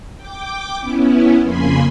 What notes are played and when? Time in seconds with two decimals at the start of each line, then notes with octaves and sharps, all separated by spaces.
0.16 G5 D6
0.79 B3 C#4 E4
1.42 F2 C#3 A#3 G#5 B5 C6